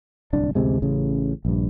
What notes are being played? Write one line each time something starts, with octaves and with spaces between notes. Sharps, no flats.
D1 C2 D4
A1 D2 C3 G#3
A1 C#3
A#1 G2